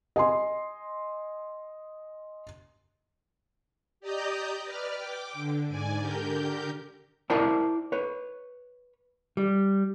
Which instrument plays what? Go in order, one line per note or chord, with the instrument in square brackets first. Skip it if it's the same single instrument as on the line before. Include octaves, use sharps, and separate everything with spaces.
[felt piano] D#5 G#5 C6
[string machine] G4 D5 D#5 A#5 D#6 G6
B4 D5 F6
G5 D6
D3
G#2 D5 G#5
D3 G4 A#4 G6
[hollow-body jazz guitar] E4 A#4 C5 D5 G5 A5
B4 C#5
G3